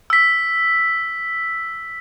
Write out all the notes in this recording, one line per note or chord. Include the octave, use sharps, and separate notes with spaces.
E6 B6